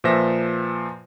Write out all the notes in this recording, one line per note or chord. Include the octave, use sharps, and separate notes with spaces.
A#2 F3 B4 C5 E5 A#6